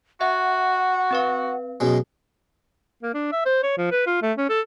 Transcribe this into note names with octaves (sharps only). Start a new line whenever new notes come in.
F#4 E5 F#5
C4 B4 F5
F#2 B2 G#3
A#3
D4
E5
C5
C#5
F3
B4
F4
A3
C#4
A4